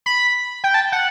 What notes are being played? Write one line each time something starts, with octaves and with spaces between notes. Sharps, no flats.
B5
G5
A5
F#5